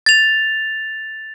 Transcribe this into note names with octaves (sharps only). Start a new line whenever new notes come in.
A6 F7